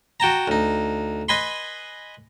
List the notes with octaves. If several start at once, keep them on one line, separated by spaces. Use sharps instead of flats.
F#4 G5 A5 A#5
D2 D#4
B4 D#5 G#5 B5 C6